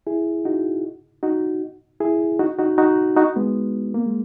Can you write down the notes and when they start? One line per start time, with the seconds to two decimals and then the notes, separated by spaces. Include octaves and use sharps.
0.07 E4 G#4
0.45 D#4 F#4
1.23 D#4 F#4
2.00 E4 G#4
2.39 D#4 F#4
2.58 D#4 F#4
2.78 D#4 F#4
3.17 D#4 F#4
3.36 G#3 B3
3.94 A#3
4.06 G#3